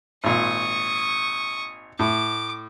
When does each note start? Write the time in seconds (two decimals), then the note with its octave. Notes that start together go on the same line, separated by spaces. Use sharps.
0.24 G#1 A#2 C#6 D#6
1.99 A2 D6